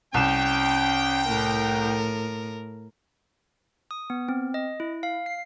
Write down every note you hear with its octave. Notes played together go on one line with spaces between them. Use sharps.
C2 C#4 G5 E7
A2 A#4
D#6
B3
C4
D#5
E4
F5
C7